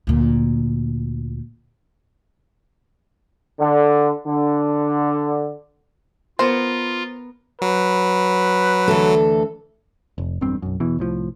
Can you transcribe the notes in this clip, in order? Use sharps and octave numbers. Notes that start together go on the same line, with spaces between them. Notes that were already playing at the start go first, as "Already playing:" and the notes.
D2 A#2
D3
D3
B3 F4 A#4 C5
F#3 B4
D2 E3 A4
F1
E1 B1 G2 C4
B1 F#2
E2 B2 E3
C2 A2 F3